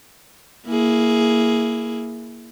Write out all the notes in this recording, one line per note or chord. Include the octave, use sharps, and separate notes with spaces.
A#3 E4 G#4